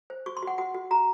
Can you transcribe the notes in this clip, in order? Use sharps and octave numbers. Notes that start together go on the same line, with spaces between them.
C5
F#4 C#6
C6
F#4 F#5
F#4 F#5
F#4
F#4 A#5